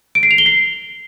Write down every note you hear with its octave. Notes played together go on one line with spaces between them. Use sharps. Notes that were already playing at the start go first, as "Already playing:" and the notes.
D7
C7
F7
G7
C7